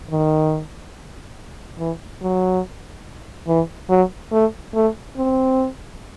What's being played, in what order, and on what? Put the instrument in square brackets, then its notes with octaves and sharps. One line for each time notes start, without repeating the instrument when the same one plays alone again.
[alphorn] D#3
E3
F#3
E3
F#3
A3
A3
C4